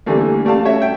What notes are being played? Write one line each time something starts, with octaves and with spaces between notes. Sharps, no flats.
D3 E3 G3 A3 A#3
G3 A3 D5 F5 A5
F#4 A4 C#5 E5
E5 G5